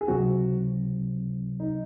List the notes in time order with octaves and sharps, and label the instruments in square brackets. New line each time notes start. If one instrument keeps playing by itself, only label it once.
[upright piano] G#4
[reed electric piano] C#2 C3 F#3 C4 [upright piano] F#4
[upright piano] D#4